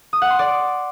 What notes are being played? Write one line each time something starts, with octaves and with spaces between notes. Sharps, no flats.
D#6
F#5
C6
D5